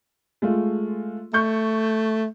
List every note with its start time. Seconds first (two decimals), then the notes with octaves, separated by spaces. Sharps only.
0.42 G#3 A3 F4
1.34 A3 C#6 G6